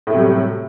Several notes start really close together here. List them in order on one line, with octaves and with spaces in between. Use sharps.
A2 A3 C3 F#3 G3